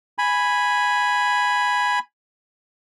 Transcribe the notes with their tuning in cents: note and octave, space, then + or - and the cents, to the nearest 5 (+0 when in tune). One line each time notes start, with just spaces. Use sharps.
G#5 +0 B5 +0